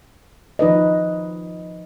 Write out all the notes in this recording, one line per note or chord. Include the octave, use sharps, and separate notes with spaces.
F3 D#4 B4 D#5